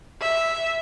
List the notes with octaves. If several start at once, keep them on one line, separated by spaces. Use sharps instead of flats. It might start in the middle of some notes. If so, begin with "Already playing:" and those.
E5